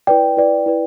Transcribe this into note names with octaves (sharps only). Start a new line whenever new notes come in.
E4 B4 D5 G5
E4 B4 D5
E4 B4 D5